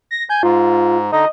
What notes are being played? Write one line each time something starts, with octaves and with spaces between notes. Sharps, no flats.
A#6
G#5 G6
G#2 F4
D3 D#4 D#5